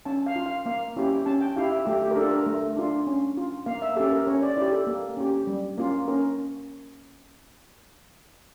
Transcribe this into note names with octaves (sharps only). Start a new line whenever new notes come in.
C#4 A5
F5
F4
F5
A#3 F5
C#4 E4 G4
C#4 A5
G5
E4 G4 F5
E5
A3 G4
G4
A#4
D4 A4
F4
A#4
A3
D4 F4
C#4
F4
A#3 F5
E5
C#4 G4 A4
A#4
C#4 C#5
D5
E4 G4 D5
A4
A#3
C#4 G4
G3
A#3 C#4 F4
C#4 A#4